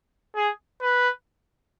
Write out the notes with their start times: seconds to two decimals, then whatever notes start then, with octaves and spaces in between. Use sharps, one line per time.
0.36 G#4
0.82 B4